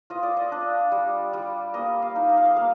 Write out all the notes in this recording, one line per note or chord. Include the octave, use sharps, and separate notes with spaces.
F4 D#5
D5
D#5
D4
G3
G3
A#3 D#5
F5
D#4
D#5
F5
D#5
A#3 F5